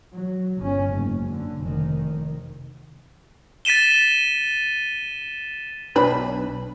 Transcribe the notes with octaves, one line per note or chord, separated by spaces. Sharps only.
F#3
G1 C#4
F#1 G#2
D3
F1 D#3
A6 B6 D#7 E7 G7
B1 D4 B4 B5